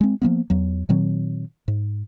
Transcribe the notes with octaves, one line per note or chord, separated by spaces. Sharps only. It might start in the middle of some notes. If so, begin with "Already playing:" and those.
G#3 C4
F3 G3 A#3 B3
E2 F#3
A#2 D#3 F#3 C4
G#2